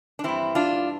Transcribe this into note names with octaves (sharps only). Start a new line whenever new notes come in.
D4
G2 E3 C4 E4
D4 F4